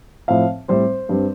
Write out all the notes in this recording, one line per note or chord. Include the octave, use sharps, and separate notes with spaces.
A2 F3 C4 F5
A2 G3 C4 C5
G2 G3 C4